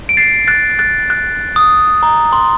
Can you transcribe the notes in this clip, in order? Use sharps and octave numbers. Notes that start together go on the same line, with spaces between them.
D7
A6 C7
F#6 A6
F#6 A6
F#6
D#6
A#5
C6